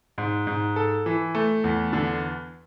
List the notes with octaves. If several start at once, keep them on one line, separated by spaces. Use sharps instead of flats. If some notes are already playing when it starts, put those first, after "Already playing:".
G#2
G#2
A4
E3
A3
E2
D3